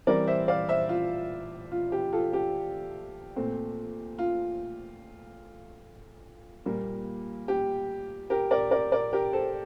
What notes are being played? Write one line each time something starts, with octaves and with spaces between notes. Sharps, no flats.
E3 G3 C4 A#4 D5
C5 E5
D5 F5
C5 E5
F4
F4
G4
F4 A4
G4
A#2 A3 C4
F4
A#2 G3 A#3
G4
G4 A#4
A#4 D5
A#4 D5
A#4 D5
G4 A#4
A4 C5